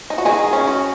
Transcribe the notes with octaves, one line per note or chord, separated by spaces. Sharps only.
D#4
F#4
D#3 D#4 G#4
C#4
F#4